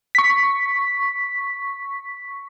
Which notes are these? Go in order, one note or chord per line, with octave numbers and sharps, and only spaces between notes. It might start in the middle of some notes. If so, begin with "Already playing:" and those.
C#6 B6